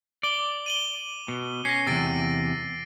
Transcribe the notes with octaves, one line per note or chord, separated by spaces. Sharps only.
D5 D6 G7
D#7 F#7 G7
B2
C#4 A#6 C7
E2 G2 C3 E6 A6 D7